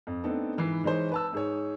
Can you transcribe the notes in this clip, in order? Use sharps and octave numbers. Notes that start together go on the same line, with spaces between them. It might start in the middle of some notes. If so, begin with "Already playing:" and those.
F2
A3 B3 C4 D4 D#4 A4
G#2 E3 B4 C7
E3 G#3 D#4 C5 C#5
B4 A5 E6
G#2 G#4 C#5